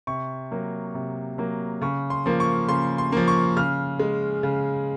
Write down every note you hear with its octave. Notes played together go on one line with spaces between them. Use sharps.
C3 C#6
F#3 A#3
C3
F#3 A#3
C#3 C#6
C6
F3 A#3
C#6
C#3 C6
C6
F3 A#3
C#6
C#3 F6
G#3
C#3